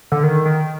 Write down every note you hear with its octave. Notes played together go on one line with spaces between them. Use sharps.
D3
D#3
D#3